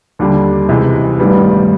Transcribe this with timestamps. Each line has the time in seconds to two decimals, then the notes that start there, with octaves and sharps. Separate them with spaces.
0.19 D#2 D3 G3
0.69 C#2 C3 E3 G#3
1.19 A1 G2 D#3 G3 B3